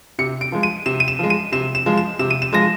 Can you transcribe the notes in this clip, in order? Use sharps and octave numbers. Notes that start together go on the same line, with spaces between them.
C3 C#7
D7
F3 G#3
D#7
C3 E7
D#7
E7
F3 G#3
D#7
C3 E7
E7
F3 G#3
E7
C3 E7
D#7
E7
F3 G#3 A#6